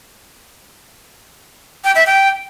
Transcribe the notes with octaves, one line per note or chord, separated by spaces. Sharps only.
G5
E5
G5